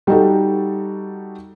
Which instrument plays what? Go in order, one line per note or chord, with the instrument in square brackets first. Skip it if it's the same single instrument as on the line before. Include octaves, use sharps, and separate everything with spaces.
[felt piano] G3 D#4 F#4 A4